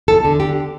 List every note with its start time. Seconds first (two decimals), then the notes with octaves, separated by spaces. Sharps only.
0.08 E2 A4
0.25 D3
0.40 D3 G4